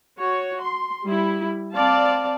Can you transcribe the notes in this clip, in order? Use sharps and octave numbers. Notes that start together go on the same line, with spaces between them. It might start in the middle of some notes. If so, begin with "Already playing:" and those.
F#4 C#5
C6
G3 E4
C4 D5 F5 A5